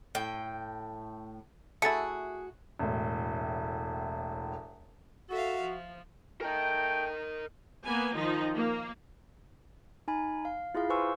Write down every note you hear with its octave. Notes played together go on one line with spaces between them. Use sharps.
A2 G5
A3 E4 F#4 G#4 A6 C#7
E1 A2
F#4 A4 E5 F5
F3
A3 A#4 D#5 G5
A#3 B3 G#5
D#3 F3 D#4 D#5
A#3
D#4 G#5 B5
F5
E4 F4 G#4 F5
B4 C5 G#5 C6 C#6 E6